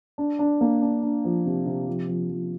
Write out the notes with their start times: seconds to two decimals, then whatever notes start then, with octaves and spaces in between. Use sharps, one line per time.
0.18 D4
0.39 D4
0.61 A#3
0.82 D4
1.03 D4
1.25 F3
1.46 C3
1.66 C3
1.87 F3
2.08 F3
2.30 F3